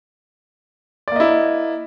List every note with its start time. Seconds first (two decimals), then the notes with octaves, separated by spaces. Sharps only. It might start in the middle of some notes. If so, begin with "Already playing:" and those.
1.08 D5
1.12 A#3
1.16 D#5
1.20 E4